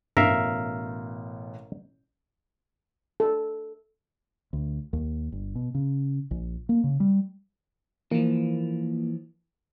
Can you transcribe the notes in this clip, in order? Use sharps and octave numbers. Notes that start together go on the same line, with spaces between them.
A1 G2 B2 A#4 E5 F5
A4
D2
D#2
G1
B2
C#3
A#1
A#3
C#3
G3
E3 F3 A#3